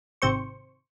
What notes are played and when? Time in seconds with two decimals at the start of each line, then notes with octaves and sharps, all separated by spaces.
0.22 G#1 C3 C5 C#6